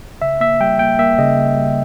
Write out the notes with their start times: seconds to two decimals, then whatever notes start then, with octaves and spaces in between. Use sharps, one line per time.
0.22 C#3 E5
0.41 A#3 E5
0.60 G3 G5
0.79 A#3 G5
0.99 A#3 E5
1.18 C#3 D#5
1.38 C#3
1.57 G3